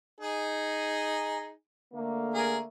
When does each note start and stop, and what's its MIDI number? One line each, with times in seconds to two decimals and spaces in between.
0.20 1.51 63
0.20 1.51 68
1.93 2.64 50
1.93 2.64 57
1.93 2.64 58
2.34 2.57 68
2.34 2.57 70